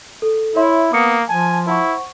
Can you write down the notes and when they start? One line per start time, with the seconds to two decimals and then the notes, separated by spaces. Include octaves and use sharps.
0.22 A4
0.56 E4 C#5 E5 C6
0.93 A#3 B3 D#6 C#7
1.29 F3 G#5 A5
1.67 E4 C5 F#5 C#6